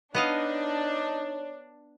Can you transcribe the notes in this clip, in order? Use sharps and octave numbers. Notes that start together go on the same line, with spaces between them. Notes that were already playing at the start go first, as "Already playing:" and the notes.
B3 D4 D#4 C#5 D#5 F5